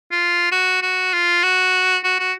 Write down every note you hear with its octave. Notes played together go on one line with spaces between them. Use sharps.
F4
F#4
F#4
F4
F#4
F#4
F#4